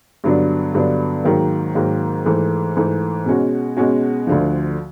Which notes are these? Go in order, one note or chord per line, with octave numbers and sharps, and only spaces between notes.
G2 D3 F#3 B3 D4
G2 D3 F#3 B3 D4
G#2 D#3 F#3 A#3
G#2 D#3 F#3 A#3
G#2 E3 A3
G#2 E3 A3
B2 G#3 C#4 F#4
B2 G#3 C#4 F#4
D2 D3 F3